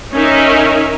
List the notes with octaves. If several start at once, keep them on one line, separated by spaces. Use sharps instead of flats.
C#4 D#4 A#4 E5